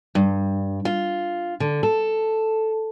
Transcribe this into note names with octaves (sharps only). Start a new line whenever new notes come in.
G2
F4
D3
A4